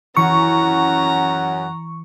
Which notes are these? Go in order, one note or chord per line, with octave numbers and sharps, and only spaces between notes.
F#2 E3 C#4 F#5 A#5 C#6